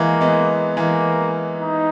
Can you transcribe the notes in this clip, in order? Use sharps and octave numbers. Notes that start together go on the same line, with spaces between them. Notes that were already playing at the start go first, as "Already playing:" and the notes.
Already playing: E3 G#3 A#3
G#3 B3
E3 G#3 A#3
D#4